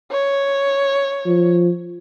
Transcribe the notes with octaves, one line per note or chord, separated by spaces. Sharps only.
C#5
F3